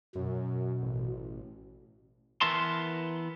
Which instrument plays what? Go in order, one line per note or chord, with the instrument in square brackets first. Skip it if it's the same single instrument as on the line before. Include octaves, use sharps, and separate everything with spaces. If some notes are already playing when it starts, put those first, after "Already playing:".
[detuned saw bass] F#2 [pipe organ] B2
[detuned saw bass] A1
[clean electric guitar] E3 B3 E4 A#4 A5 C6